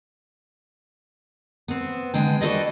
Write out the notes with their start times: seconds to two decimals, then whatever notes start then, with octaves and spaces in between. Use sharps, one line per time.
1.68 B3 C4
2.14 D3 G#3 B3 G5
2.41 F#4 A4 B4 C5 D5 D#5